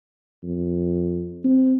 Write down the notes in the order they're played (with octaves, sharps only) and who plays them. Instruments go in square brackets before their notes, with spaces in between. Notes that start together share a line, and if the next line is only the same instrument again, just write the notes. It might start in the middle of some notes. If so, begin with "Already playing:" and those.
[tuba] F2
C4